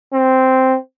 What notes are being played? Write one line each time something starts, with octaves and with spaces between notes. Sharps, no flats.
C4